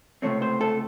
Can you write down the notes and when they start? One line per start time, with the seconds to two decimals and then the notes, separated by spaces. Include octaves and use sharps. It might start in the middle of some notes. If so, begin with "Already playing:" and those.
0.22 C#2 C3 D#3 A3 C4 C#5
0.42 C5
0.61 A4